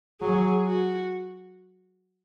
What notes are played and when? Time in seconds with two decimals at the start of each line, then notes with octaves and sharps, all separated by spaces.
0.21 F#3 G#4
0.67 F#4